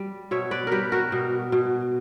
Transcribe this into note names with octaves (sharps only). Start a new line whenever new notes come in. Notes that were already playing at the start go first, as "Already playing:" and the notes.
Already playing: G3
B2 C#5 E5
B4 D5
G3 G4 A#4 B4
F#4 A#4
B2
B2